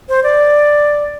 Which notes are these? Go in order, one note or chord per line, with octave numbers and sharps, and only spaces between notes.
C5
D5